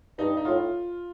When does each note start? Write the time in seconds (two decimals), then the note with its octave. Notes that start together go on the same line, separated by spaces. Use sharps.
0.18 G2 D#4
0.37 D#4
0.45 A2 F4